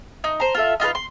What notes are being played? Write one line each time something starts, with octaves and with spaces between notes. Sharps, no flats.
D#4
C5 A#5
F4 A4 E5
D#4 F4 A4 B4
C6